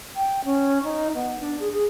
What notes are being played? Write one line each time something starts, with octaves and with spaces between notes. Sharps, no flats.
G5
C#4
D#4
B3
D4
G#4
G#4